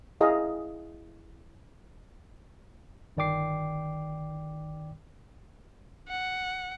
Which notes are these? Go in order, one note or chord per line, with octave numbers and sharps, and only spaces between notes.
E4 G#4 D#5 F5 G5 A#5
G1 D#3 D5 G5 D6 C7
F#5